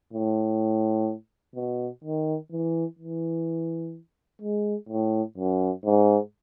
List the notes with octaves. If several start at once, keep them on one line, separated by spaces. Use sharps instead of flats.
A2
B2
D#3
E3
E3
G#3
A2
F#2
G#2